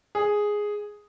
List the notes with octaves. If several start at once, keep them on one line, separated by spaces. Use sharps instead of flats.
G#4